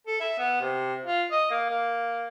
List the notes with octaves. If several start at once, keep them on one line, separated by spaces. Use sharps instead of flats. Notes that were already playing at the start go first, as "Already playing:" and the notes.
A4
E5
B3
C3
F4
D#5
A#3
A#3